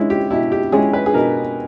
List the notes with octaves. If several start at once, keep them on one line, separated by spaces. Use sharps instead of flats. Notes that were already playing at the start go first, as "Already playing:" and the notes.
Already playing: G#3 C#4 E4
G4
B2 E4
G4
G#3 C#4 E4 G#4
B4
G#4
B2 A#4